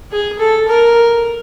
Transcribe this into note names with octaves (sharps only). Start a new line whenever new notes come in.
G#4
A4
A#4